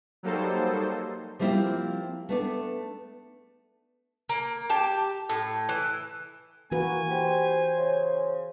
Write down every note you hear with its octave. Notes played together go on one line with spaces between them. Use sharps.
F#3 G3 A#3 D#4 A4 C5
F3 G3 A#3 C4 E4 F4
A3 B3 D4
A#3
G4 A5
A2
E3
E3 A#3 F#4 B4 G#5
G4 C5
C#3